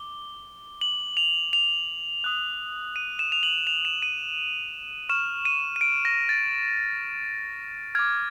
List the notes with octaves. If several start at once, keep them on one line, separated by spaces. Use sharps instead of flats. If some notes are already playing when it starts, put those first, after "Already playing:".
Already playing: D6 G7
F#7
F7
F7
D#6 F#6
D#7
E7
F7
F#7
F7
E7
D#7
C#6 F6 E7
D#7
D#7
D7
A#6
A6
D6 F6 G#6